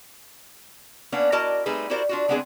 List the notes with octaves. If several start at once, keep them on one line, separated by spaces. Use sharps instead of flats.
A#3 B3 C#4 D4
E4 F#4 A#4 D5 D#5 A5
G3 A3 C4 D#4 G#4 B4
E4 F#4 G4 A#4 C5 D5
D4 F4 F#4
D3 G#3 B3 C4 D4 G#4